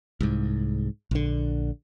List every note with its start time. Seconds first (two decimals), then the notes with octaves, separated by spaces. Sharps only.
0.21 C2 G#2
1.11 A#1 D3